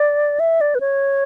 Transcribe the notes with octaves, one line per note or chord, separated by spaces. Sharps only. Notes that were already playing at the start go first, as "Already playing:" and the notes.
Already playing: D5
E5
D5
B4
C#5